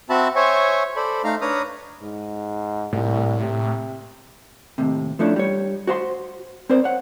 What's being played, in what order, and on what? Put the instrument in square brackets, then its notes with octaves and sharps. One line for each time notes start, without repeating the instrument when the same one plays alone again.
[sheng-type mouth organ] C4 F#4 E5 A5 B5
C5 C#5 E5 G#5 C#6
A4 C5 D5 B5
A3 D#4 F5 A#5 F6
D4 B4 C#5 A#5 D#6 F6
[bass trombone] G#2
[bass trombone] C2 [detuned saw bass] A2
[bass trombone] C3
[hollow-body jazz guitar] D#2 A2 C3
F3 A3 C#4 D4 E4
G3 C#5
F#4 C5 F5 C6
C4 A#4 C5 D5
C#5 F#5